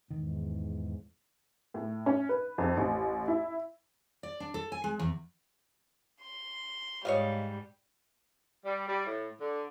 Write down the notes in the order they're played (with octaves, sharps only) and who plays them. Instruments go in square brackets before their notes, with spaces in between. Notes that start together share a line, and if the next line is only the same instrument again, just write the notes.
[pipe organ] E2 G#2 [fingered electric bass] D#3
[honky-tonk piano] A2
C#4
B4
F2
A1
E4
[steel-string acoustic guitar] D5
D4
A4
G#5
G#3
E2
[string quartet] C6
[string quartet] G#2 G3 [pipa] C#5 D#5 F5
[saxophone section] G3
G3
A2
D3